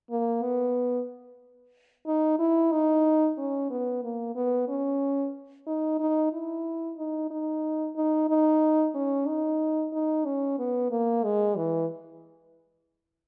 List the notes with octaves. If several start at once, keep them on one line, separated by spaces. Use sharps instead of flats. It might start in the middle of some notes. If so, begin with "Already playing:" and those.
A#3
B3
D#4
E4
D#4
C#4
B3
A#3
B3
C#4
D#4
D#4
E4
D#4
D#4
D#4
D#4
C#4
D#4
D#4
C#4
B3
A#3
G#3
E3